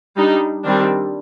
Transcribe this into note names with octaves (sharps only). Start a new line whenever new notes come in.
G3 D4 D#4
D#3 G3 C4 D4